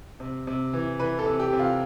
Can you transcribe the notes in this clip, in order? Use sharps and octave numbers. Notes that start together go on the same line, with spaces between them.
C3
C3
E3
E3 B4
A4
C3
G4
C3
F4